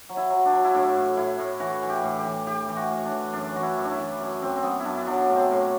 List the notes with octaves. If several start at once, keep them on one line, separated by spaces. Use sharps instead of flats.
F#3
E4
F#3
D4
F#3
E4
A2 D4
A2
A2 E4
A2
E3 F#4
E3
G4
A2
G4
E3
E3 G4
E3
F#4
A2
D4
E3
F#2 D4
E3 F#4
E4
F#2
D4
E4
E3
F#2
F#2 C4
C4
F#2 B3
E4
F#2 D4
E4
F#3 D4
A2
C4
A2